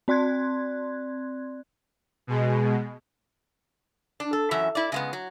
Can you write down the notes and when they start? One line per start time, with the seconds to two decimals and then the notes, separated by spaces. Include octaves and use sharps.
0.08 C4 D5 C6 F#6 G#6
2.27 B2 G#3
4.20 D4
4.33 A4
4.51 F#2 E3 C#4 E5
4.75 E4 D5
4.92 C#3 G#3 B3
5.13 F#3